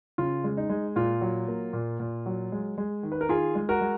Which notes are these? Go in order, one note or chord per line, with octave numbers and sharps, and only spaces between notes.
C#3 F4
G#3
D#4
G#3
A#2 F4
F#3
A#3
A#2
A#2
F#3
G#3
G#3
D#3
B4
A#4
D#3 F4 G#4
G#3
F#4 A#4
G#3